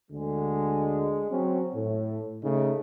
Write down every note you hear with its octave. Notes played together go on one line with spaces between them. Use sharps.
D2 D3 G#3
F#3 C4 C#4
A2
C#3 A3 D#4